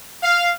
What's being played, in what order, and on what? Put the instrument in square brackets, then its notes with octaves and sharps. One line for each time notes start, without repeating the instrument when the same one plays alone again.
[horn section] F5